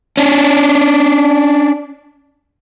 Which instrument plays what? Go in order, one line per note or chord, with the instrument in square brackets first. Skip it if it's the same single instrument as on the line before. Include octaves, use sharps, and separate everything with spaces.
[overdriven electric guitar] C#4 D4